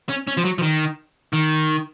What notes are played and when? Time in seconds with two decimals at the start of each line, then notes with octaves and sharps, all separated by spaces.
0.09 C#4
0.27 C#4
0.37 F3
0.45 F#3
0.58 F3
0.62 D#3
1.33 D#3